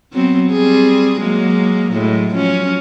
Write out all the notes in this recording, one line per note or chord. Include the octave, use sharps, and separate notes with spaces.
F#3 B3 C4
G3 C4 G#4
F#3 G#3 A#3
A2 F#3 G#3
F3 F#3 C#4